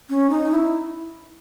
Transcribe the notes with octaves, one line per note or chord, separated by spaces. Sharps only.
C#4
D#4
E4